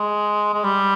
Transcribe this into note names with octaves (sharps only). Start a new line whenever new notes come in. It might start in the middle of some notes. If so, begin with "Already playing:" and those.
Already playing: G#3
G#3
G3